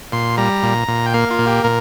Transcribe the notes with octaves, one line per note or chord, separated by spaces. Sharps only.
A#2 C6
G3 A#5
A#2
A#2
G5
A#3 F5
F4
A#2
G4
A#2 A#4